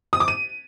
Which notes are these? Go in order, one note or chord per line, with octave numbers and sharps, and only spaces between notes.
D#6
D6
D#7